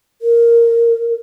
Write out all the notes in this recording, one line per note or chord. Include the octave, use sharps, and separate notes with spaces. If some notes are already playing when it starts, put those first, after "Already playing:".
A#4